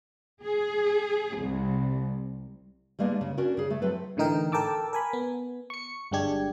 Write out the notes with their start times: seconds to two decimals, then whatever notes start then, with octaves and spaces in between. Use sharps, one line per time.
0.43 G#4
1.36 C2
2.99 G3 G#3 A#3 B3 D4
3.21 C#3
3.37 C#4 D4 F#4 A#4
3.57 C#3 G#4
3.70 A3
3.82 F#3 C4 A4 B4
4.17 A2 D3 E3 D#4 A#4 G5
4.52 A4 A#4 G5 A5 D6 E6
4.93 A#4 G#5 B5
5.13 B3
5.70 C#6 C#7
6.11 G1 G2 G#3 D4 G4 G#6